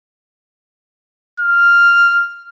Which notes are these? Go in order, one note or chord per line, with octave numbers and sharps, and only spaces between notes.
F6